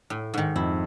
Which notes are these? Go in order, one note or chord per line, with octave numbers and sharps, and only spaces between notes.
A2
G#2 D#3
F2 E4